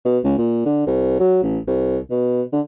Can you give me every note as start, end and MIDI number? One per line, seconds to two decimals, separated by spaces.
0.05 0.18 47
0.24 0.34 37
0.38 0.65 46
0.66 0.85 50
0.87 1.15 36
1.19 1.39 54
1.43 1.59 33
1.67 1.99 36
2.11 2.42 47
2.52 2.60 50